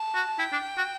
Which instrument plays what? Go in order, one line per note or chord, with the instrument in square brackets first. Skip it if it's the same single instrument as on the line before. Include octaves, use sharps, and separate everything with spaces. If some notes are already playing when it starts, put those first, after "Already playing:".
Already playing: [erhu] A5
[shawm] F#4
[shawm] E4 [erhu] G5
[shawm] D4
F#4